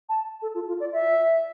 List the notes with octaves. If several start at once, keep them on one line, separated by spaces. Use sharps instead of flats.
A5
A4
F4
F4
D5
E5